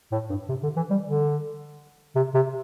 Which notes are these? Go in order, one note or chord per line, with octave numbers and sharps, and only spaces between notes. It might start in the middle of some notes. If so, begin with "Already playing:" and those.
A2
G2
C3
D3
E3
G3
D3
C3
C3